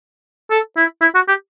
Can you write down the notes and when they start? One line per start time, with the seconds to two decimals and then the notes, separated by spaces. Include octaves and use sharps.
0.51 A4
0.77 E4
1.01 E4
1.15 F#4
1.28 G4